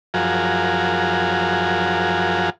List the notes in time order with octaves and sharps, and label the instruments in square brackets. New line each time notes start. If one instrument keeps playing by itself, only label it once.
[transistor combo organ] F#2 F3 F4 F#4 G#4 A#4